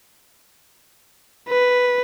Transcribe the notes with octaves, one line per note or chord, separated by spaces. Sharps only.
B4